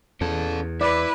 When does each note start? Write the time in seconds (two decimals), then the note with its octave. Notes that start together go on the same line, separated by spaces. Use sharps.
0.21 E2 C#4 A4
0.81 E4 B4 D5